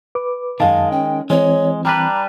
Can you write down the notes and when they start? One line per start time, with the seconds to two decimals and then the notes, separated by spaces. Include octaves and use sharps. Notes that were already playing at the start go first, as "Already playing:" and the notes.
0.15 B4 D6
0.60 F#2 D#3 G#3 F5 A5
0.92 C#4 G5
1.30 E3 G#3 C4 C#5
1.85 G3 D4 B4 A#5